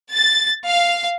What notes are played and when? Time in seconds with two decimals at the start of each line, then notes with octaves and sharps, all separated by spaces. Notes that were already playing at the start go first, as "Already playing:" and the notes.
0.12 A6
0.67 F5